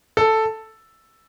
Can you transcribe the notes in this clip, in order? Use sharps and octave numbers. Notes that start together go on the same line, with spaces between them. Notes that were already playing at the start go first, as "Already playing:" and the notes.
A4